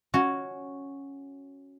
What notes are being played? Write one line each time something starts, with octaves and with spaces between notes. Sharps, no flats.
C#4 F#4